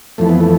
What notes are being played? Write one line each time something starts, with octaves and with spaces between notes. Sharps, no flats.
F2 E3 A3
B3
A3